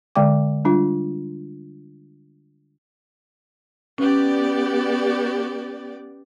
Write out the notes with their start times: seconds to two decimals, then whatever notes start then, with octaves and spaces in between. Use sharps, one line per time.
0.16 D3 G#3 D5 G5 D6
0.65 G3 D4 F4
3.98 B3 C#4 G4 D5